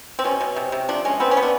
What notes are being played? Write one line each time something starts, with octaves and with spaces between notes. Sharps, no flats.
C4
B2 C#4
B2
C3
C3
F3 D4
G#3 C#4
B3 C4
C#4
B3
D4